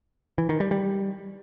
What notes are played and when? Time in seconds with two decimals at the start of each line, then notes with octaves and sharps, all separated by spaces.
0.38 E3
0.49 D#3
0.60 G3
0.71 G3